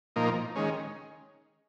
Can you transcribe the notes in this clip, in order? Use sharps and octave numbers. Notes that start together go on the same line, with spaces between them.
A#2 F3 A#3 D#4
D#3 G#3 C#4